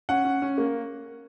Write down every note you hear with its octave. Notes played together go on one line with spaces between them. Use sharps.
C#4 F#5
C#4
C#4
A#3